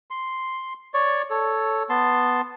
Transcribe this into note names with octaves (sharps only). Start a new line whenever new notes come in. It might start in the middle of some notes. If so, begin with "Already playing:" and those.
C6
C#5 D5 C#6
A4 C#5
B3 A5 C6